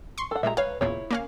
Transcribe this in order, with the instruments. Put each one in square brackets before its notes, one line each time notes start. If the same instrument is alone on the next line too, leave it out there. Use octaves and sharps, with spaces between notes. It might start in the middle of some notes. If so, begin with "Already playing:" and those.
[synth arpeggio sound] C6 C#6
[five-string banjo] A4 F#5
[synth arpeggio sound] A#2 G3 G#3 [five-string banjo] E5 A#5
[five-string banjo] B4 C#5 [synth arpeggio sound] F5
[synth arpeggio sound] E2 A#2 C#3 [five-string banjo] E4 C#5
[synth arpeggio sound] A#3 C#4 F5